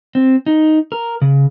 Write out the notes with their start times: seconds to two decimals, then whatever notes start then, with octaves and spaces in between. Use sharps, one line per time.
0.15 C4
0.46 D#4
0.92 A#4
1.21 C#3